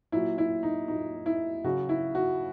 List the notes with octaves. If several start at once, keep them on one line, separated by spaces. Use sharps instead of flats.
A#2 F#3 E4
E4
D#4
A#2 F#3 D#4
E4
C#3 F#3 F#4
E4
F#4